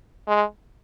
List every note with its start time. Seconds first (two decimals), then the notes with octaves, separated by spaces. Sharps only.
0.28 G#3